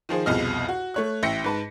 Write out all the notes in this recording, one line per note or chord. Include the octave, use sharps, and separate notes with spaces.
D#3 F3 G#4 C5
C2 F2 B2 G#4 D#5 F6
F#4
A3 C#5 F#6
A1 E5 G5 A#6 B6 C#7
G#2 B4 A5